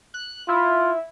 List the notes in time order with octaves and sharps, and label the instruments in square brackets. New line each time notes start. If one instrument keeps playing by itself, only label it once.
[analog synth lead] F#6
[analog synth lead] E4 [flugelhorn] F4